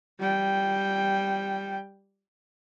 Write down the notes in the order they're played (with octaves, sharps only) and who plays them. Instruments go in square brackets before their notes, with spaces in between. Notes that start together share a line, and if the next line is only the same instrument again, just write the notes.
[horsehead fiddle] G3 G5